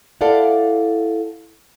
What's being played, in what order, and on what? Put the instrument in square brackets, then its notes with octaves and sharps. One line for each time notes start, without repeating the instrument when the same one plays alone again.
[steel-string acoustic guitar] E4 A4 D5 F5 F#5